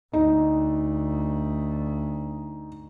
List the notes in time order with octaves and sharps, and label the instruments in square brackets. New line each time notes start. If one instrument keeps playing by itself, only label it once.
[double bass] D2 [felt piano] D#4